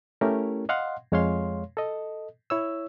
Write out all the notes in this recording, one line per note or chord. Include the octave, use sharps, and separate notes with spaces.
A3 C#4 E4 G4 A#4
D#5 F5 F#5 C6
F2 G#3 C#5 F5 C6
A4 D#5
E4 C#5 E6